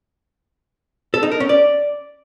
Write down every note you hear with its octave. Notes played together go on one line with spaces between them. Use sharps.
A4
D#4
A#4
C#4
D5